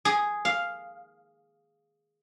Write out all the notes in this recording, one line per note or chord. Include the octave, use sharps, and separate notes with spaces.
G#4
F5